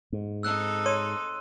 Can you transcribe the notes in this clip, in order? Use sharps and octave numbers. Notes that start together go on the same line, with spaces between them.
G#2
C4 D#4 A4 E6 F#6 C#7
C#5 C6 D#7